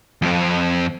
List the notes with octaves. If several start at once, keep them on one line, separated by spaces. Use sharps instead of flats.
F2 C4